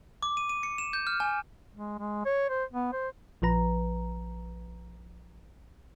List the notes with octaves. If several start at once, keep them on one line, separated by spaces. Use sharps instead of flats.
D6
D#7
D#7
C#7
E7
G6
F6
G#5
G#3
G#3
C#5
C5
B3
C5
A#1 F3 B4 A#5